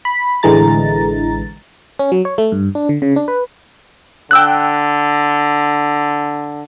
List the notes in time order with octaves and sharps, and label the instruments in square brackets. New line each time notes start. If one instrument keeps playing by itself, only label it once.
[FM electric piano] B5 B6
A1 D3 E3 G#3 A#5 A6
C#4
F#3
C#5
A3
G2
D4
D3
C#3
D4
B4
[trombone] D3 [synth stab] G5 E6 F#6